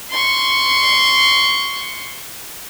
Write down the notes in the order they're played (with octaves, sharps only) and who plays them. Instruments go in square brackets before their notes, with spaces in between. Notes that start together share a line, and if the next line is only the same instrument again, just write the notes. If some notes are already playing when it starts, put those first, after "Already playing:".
[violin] C6 C#6